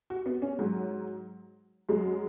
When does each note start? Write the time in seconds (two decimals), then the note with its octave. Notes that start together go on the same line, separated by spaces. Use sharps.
0.10 F#4
0.26 B3
0.42 C#4
0.59 G#2 F#3
1.89 F#2 F#3 G#3